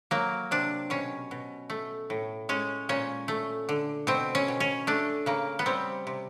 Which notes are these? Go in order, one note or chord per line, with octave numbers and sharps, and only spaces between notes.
F#3 A#3
C3 D4
B2 C#4
B2
A3
A2
G#3 C#4
A#2 C#4
A3
D3
B2 C4
C#4
B2
C#4
A3 D4
C#3 A#3
B3
G3 C4
C3